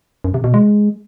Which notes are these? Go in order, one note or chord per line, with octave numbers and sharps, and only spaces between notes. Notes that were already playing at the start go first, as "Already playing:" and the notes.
F#2
C3
B2
G#3